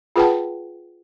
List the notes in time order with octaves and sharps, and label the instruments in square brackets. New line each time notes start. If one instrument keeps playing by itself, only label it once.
[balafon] F4 G#4 B4 F#5 G5 A5